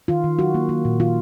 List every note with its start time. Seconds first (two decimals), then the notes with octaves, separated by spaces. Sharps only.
0.08 D#3 F4
0.24 D#3
0.39 F#3 F#4
0.54 A#3
0.69 A#3
0.85 A#2
1.00 D#3 F4